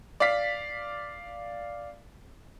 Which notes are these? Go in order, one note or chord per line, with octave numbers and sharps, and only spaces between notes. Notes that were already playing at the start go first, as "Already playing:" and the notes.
D5 F5 B6